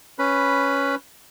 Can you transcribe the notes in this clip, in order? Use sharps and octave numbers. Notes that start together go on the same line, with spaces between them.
C#4 B4 B5